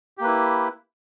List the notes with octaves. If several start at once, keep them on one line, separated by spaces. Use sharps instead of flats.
A#3 E4 G4 B4